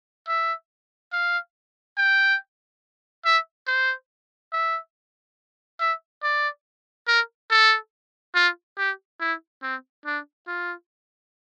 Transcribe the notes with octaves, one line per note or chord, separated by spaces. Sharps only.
E5
F5
G5
E5
C5
E5
E5
D5
A#4
A4
F4
G4
E4
C4
D4
F4